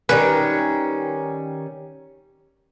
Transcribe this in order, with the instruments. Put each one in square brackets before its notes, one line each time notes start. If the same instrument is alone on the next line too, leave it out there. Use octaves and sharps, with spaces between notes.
[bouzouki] D#3 G3 C#4 [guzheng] B4